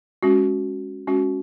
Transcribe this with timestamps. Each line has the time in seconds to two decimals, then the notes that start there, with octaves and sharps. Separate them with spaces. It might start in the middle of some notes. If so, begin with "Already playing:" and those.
0.23 G#3 C#4 F#4
1.07 G#3 C#4 F#4